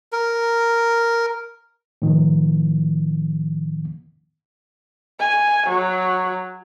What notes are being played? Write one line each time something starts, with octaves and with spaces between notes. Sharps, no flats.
A#4
A2 D#3 F3
G#5
F#3